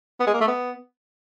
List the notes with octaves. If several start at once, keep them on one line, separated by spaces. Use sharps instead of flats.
B3
G#3
A#3
A3
B3